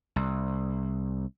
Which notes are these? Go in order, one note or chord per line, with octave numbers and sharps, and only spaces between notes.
C2